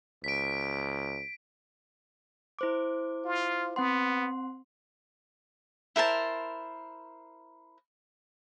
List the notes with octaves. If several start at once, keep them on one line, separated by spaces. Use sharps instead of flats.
C#2 B6 D7
E4 C5 D6
F4
B3 C4 F#5 C6
E4 A#4 C5 A5